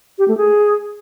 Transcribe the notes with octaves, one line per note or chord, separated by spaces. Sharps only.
G4
A3
G#4